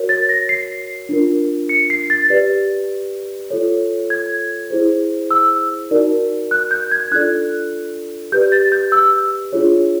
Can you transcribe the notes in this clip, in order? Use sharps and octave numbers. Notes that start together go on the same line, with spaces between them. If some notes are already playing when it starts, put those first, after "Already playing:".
Already playing: F#4 A#4 C#5
A6
A#6
C7
D4 F4 A#4
C#7
C7
A6
G4 B4 D5
F4 A4 C#5
G#6
E4 G#4 C5
E6
D#4 F#4 A#4 D5
F#6
G6
G#6
D4 F4 A4 D5 F#6
G4 B4 D5 G6
A6
G6
E6
D4 F4 G#4 C#5